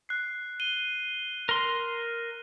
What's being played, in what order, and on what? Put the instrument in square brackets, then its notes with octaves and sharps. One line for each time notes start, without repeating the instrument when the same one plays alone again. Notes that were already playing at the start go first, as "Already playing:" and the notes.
[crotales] F#6 C7
D#7 G7
[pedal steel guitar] A#4 C6